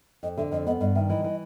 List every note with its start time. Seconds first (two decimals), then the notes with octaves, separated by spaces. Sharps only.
0.23 F2 D#5
0.37 D3 E5
0.51 F2 D#5
0.67 B3 D#5
0.80 G2 D#5
0.95 D#3 E5
1.09 E3 D#5
1.24 E3